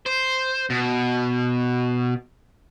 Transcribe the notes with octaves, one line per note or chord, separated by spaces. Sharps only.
C5
B2